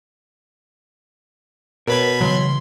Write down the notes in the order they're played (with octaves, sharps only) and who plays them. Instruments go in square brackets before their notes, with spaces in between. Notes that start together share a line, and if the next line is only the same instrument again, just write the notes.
[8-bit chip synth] B2 B5 G#6 [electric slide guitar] A#4 C#5 [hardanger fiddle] B4
[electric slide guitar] C#3 E3 [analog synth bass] F#3 [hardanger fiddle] C6